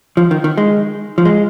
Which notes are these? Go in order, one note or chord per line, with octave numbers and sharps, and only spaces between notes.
F3
D#3
D#3
G#3
F3
G#3